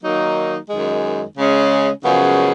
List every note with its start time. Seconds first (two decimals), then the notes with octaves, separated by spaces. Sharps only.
0.03 D#3 F#3 A#3 D#4
0.69 F#2 D#3 G#3
1.36 C#3 G#3 C#4
2.03 F#2 C#3 F3 G#3 B3